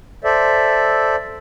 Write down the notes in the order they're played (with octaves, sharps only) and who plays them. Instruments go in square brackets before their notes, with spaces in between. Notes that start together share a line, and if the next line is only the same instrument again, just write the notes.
[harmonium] A4 C5 D5 E5